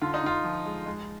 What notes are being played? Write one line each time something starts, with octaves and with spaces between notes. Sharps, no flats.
D3 F4
D#4
D3 F4
F3
G#3
G#3